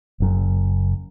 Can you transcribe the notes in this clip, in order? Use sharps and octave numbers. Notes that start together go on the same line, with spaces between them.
F#1 F#2 C#3